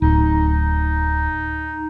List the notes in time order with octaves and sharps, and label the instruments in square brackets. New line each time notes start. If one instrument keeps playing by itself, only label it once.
[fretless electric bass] D1 [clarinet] D#4